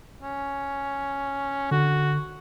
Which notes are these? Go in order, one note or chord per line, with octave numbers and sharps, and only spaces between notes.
C#4
D3 F#4